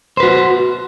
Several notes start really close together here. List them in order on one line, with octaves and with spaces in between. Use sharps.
C5 B4 F#4